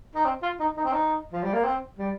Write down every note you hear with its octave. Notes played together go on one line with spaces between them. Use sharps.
D#4
C4
F4
D#4
D#4
C4
D#4
F3
G3
A#3
C4
G3